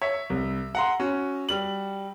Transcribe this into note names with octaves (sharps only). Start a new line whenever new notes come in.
C#5 E5
C2
F#5 A#5 C6
C#4 F#4
G3 F#7